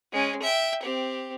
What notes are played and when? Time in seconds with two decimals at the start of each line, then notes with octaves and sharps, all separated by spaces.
0.12 G#3 C#4
0.43 E5 G5
0.83 C4 G4